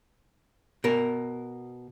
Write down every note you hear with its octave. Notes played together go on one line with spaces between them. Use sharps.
B2 A#4